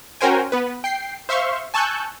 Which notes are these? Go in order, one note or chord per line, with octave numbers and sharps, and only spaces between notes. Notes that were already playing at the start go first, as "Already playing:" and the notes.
C#4 F#4 A#4 C5 G5 G#5
B3 B4
G5 C7
C5 E5 F5 C6 C#6
G#5 A5 C#6 E6 F#6 G6